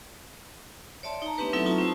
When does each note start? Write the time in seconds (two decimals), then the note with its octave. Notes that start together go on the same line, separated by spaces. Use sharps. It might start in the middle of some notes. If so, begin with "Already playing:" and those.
1.03 C#5 D5 E5 A5 C6
1.22 D#4 A#5
1.38 A3 B3 C4 D4 G4 B4
1.53 F#3 C4 D#4 E4 A4 E5
1.66 D#4 F4 A5 C#6 D#6
1.78 C4 G4 C5 E6